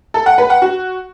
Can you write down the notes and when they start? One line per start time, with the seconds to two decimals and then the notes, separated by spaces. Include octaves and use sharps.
0.14 A4
0.26 F#5
0.38 B4
0.50 F#5
0.62 F#4